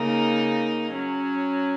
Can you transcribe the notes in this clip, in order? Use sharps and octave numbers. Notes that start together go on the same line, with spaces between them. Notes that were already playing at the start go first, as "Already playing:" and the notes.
Already playing: C#3 A#3 D#4
F#3 C#4